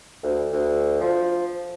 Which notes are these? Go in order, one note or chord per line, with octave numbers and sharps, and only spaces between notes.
D2
D2
F3